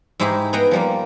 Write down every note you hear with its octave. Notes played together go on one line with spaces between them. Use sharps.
G#2 G#3 D#4 E4 G4 G#4
B3 G#4 D#5 F#5 G5
F3 G3 A#3